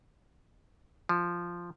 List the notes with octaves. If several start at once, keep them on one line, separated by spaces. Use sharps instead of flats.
F3